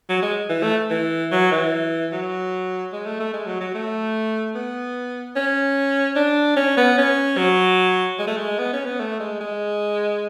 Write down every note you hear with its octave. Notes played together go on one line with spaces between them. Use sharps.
F#3
G#3
E3
A3
E3
F#3
E3
F#3
G#3
A3
A3
G#3
F#3
F#3
A3
B3
C#4
D4
C#4
B3
C#4
F#3
G#3
A3
G#3
B3
C#4
B3
A3
G#3
G#3